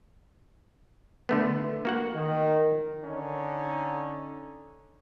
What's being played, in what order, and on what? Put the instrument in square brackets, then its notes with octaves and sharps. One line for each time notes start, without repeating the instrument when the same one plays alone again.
[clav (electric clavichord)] D3 A3 B3
A#3 F#4 F#5
[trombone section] D#3
D3 C#4 D#4